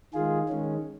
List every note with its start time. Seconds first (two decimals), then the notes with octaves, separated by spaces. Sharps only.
0.14 D#3 G#3 F4 G#4
0.49 D#3 G#3 C#4